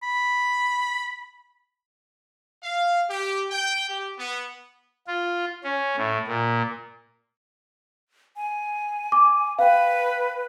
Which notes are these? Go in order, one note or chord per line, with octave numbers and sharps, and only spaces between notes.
B5
F5
G4
G5
G4
B3
F4
C#4
A2
A#2
G#5
D6
B4 F5 G5